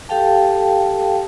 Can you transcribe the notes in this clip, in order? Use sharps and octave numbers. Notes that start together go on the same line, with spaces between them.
G4 A4 F5 G5 A5